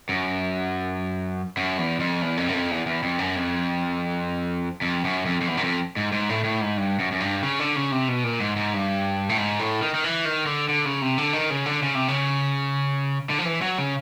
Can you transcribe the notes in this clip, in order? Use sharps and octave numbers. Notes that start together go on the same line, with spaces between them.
F#2
F#2
E2
F2
E2
F2
F#2
F2
E2
E2
F2
F#2
F2
F2
F#2
F2
F2
E2
F#2
F2
G#2
G#2
A2
A2
G#2
G2
F#2
F#2
G2
C#3
D3
C#3
C3
B2
A#2
G#2
G#2
G2
A2
G#2
A2
D#3
D#3
E3
D#3
D3
D3
C#3
C3
D3
D#3
C#3
D3
C#3
C3
C#3
D3
F3
E3
F#3
C#3